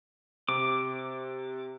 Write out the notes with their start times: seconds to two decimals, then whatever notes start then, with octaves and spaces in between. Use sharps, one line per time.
0.49 C3 D6